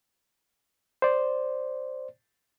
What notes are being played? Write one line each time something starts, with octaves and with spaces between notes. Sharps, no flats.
C5 D5